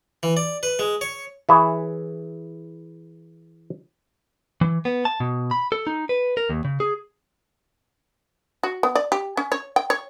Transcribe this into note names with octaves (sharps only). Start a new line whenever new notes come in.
E3
D5
B4
G#3
C#5
E3 E4 G#4 C#5 E5
E3
B3
A5
B2
B5
A4
D#4
B4
A#4
D#2
C#3
G#4
F#4
B3
D5
G4
C#4
C#5
G5
C#5